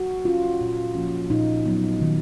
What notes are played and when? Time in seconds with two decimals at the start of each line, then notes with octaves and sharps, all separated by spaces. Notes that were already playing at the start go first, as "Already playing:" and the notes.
Already playing: F#4
0.24 F#3 C#4 F4
0.61 A#2
0.95 F3 A#3 C#4
1.30 A#2 D#4
1.66 F#3 B3
2.02 D#3